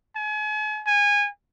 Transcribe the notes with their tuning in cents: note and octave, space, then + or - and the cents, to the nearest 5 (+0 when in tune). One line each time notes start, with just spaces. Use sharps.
G#5 +40
G#5 -20